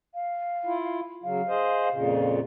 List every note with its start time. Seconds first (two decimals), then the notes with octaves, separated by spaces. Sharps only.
0.15 F5
0.65 E4 F4
1.24 C#3 F#3 F5
1.48 G#4 C5 D#5
1.91 F2 A#2 C#3